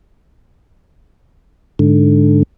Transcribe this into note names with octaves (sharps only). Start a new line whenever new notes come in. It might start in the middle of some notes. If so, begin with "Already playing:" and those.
G#2 D3